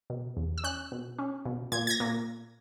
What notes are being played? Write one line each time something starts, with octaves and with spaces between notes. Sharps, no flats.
B2
E2
E6
C#4 F#6
B2
C#4
B2
A#2 G#6
G#6
A#6
A#2